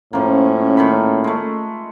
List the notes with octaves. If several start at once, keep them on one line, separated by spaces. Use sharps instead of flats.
A2 F3 A#3 C#4
A#2 D#3 B5
G#3 A3